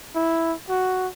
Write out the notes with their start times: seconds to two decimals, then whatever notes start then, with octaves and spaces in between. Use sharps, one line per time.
0.16 E4
0.69 F#4